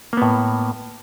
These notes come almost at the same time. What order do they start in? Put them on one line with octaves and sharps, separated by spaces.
A#3 B3 A2